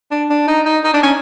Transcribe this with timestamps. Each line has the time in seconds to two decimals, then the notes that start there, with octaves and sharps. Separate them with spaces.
0.12 D4
0.30 D4
0.48 D#4
0.66 D#4
0.84 D#4
0.94 D4
1.03 C#4